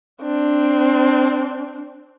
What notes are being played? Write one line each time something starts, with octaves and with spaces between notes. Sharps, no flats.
C4 D4